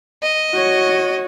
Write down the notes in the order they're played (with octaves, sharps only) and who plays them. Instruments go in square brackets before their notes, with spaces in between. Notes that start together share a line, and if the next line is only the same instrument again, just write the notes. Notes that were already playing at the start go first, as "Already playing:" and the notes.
[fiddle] D#5
[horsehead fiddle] F#4 C#5